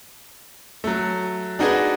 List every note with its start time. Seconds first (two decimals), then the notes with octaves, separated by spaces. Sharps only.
0.84 F#3 A3
1.59 D4 D#4 F#4 G#4 B4 D#5